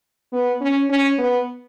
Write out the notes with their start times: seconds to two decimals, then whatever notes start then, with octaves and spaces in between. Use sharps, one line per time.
0.33 B3
0.61 C#4
0.90 C#4
1.18 B3